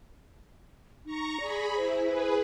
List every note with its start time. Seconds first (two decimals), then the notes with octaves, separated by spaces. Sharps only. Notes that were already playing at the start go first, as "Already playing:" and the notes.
1.06 D#4 A#5 C#6 A#6
1.40 G#4 D5 B5
1.77 E4 C5
2.06 G#4 B4